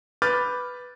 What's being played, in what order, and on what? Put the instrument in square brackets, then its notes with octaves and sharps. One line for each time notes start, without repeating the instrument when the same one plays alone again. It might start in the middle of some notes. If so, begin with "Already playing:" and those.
[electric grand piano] B4 D6 F6 G6 A6